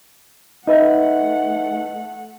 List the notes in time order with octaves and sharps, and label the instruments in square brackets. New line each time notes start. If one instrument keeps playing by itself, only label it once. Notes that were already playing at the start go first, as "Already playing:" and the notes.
[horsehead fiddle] A3 F#5 [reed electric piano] D#4 B4 E5 [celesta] D#5